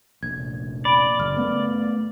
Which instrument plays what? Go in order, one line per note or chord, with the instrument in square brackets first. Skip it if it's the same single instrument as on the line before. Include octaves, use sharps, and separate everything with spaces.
[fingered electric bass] F1 A#1 [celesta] G#6
[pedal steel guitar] D5 [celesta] B5 D7
[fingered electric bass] F#1 [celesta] F6
[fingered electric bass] A3 B3